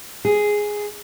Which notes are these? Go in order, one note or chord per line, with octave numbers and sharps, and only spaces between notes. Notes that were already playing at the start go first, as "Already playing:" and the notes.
G#4